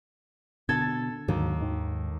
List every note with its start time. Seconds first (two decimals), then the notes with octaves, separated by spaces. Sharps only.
0.69 B2 D3 A4 G#6 A6
1.28 D#2 G#2 D3 F#3
1.61 G#2 D#3